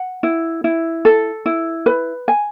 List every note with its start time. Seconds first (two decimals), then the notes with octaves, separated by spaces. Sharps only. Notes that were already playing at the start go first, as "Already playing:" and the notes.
Already playing: F#5
0.23 E4
0.64 E4
1.05 A4
1.46 E4
1.86 B4
2.28 G#5